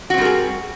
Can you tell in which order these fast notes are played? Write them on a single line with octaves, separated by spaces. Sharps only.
F#4 C4 G3 A#4 G#4